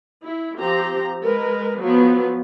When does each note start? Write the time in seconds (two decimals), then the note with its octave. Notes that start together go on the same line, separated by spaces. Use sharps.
0.23 E4
0.58 F3 C4 G4 A#5
1.22 G#3 A#4 B4
1.80 F3 F#3 B3